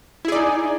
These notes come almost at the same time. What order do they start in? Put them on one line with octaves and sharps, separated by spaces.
E4 G#4 D5 D#4